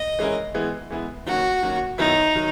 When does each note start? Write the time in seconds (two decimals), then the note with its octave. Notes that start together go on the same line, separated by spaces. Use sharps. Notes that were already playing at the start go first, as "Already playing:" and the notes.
Already playing: D#5
0.19 E3 G#3 C#4 E4 A#4
0.54 E3 G#3 B3 E4
0.90 E3 G#3 B3 E4
1.26 D#3 F#3 A#3 C#4 F#4
1.62 D#3 F#3 A#3 C#4
1.98 F#2 D#3 F#3 B3 D#4 E4
2.35 D#3 F#3